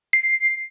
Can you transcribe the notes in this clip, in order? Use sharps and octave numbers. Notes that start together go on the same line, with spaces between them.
C7